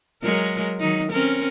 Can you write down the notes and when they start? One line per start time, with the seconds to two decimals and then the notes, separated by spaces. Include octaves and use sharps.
0.23 F#3 G#3 A#4
0.80 D#3 F#3 D#4
1.12 C4 C#4 A#4